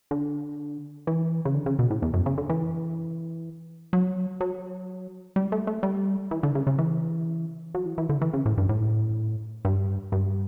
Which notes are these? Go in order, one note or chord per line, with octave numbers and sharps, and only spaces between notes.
D3
E3
C#3
D3
C#3
B2
A2
E2
F#2
C#3
D3
E3
F#3
F#3
G3
A3
A3
G3
E3
D3
C#3
C#3
E3
F#3
E3
E3
D3
E3
C#3
A2
G2
A2
G2
G2